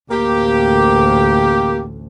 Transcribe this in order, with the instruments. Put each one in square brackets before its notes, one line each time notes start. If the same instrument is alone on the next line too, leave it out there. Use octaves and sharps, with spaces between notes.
[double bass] A1 D2 [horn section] A#3 G4